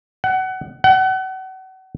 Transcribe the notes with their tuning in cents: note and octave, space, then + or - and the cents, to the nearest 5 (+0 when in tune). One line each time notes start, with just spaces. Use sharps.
F#5 +25
F#5 +35